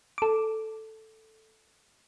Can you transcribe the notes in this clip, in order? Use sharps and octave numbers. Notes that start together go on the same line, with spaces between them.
A4 D6